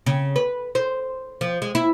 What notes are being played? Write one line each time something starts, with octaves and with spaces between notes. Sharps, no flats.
C#3
B4
C5
F3
G#3
E4